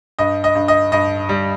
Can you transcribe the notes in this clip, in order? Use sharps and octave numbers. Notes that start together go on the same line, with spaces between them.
G2 D#5
D#5
G2
D#5
G2 D#5
G3